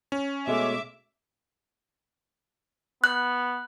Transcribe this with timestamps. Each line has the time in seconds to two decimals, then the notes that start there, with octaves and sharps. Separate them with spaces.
0.12 C#4
0.47 B2 G#3 A3 E5 D6
3.04 B3 F#6